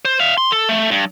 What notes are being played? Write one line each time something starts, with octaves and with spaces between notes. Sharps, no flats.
C5
E5 F5
C6
A4
A3
G2